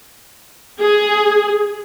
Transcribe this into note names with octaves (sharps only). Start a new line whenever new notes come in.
G#4